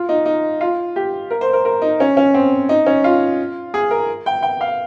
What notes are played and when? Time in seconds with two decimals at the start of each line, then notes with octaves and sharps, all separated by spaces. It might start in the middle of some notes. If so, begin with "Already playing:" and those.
Already playing: F4
0.09 D#4
0.26 D#4
0.61 F4
0.96 G4
1.30 A#4
1.41 C5
1.53 A#4
1.65 A#4
1.82 D#4
2.00 C#4
2.17 C#4
2.34 C4
2.69 D#4
2.86 C#4
3.04 F4
3.74 G#4
3.91 A#4
4.26 G5
4.42 G5
4.61 F5